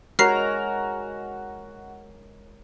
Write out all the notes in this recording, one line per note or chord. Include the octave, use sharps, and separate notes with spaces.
G#3 F#4 A#4 C#5 A#5 F6 B6 C7